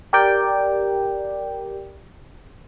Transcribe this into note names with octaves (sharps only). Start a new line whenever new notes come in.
G4 A#4 D5 G5